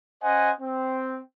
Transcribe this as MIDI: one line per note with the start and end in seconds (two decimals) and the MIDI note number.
0.23 0.51 61
0.23 0.51 72
0.23 0.51 75
0.23 0.51 78
0.23 0.51 80
0.60 1.20 60